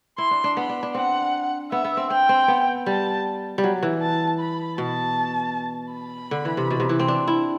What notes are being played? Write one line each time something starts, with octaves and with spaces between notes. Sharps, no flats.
E4 C6
D4
D4
B3 B5
D4
D4
C4 F#5
B3 E5
B3
C4
C4 G5
C4
B3
G3 A5
G3
F#3
E3
A5
B5
B2 A5
B5
D3
E3
C3
B2
C3
E3
C4
D4
E4